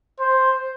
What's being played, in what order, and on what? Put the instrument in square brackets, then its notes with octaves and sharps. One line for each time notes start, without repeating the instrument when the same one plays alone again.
[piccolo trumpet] C5